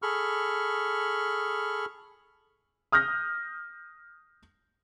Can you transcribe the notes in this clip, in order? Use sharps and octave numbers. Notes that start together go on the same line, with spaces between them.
G#4 A4 B5 C#6 F6
D#6 F6 G6 A#6